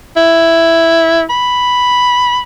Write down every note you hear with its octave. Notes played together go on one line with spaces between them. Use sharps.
E4
B5